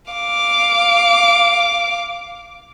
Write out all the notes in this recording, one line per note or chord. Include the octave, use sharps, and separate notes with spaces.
F5 D6